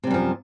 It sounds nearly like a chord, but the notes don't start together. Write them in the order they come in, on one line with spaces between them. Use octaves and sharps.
C3 G3 F#2 F3